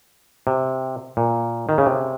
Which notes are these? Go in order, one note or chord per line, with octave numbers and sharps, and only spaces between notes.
C3
A#2
D#3
C#3
C3